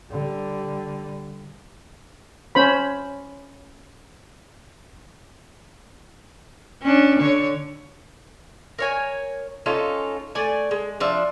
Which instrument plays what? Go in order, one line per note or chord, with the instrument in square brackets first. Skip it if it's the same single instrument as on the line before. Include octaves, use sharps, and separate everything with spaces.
[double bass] D3 G3
[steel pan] C#4 C5 B5
[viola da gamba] C#4 D4
D3 C#5
[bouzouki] A#4 C#5 G#5
C#4 D#4 F4 A4
A3 D5 G#5
G#3
F3 D4 E5